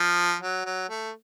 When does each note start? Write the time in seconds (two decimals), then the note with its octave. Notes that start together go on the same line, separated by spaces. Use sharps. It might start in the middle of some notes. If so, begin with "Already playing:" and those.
Already playing: F3
0.42 F#3
0.65 F#3
0.89 A3